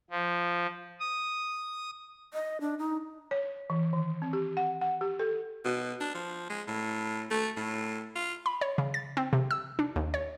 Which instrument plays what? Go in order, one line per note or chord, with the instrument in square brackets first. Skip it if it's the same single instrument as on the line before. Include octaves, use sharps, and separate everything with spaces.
[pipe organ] F3
D#6
[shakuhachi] D#5
D4
D#4
[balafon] C#5
E3
D#3
C4
G4
F#5
F#5
G4
A4
[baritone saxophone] B2
D4
F3
G#3
A2
A3
A2
F4
[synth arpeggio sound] B5
C#5
C#3
A6
C4
C3
E6
D4
D#2
C#5